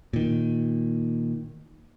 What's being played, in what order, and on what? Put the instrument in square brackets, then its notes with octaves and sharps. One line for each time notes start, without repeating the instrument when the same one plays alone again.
[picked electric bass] A#2 D#3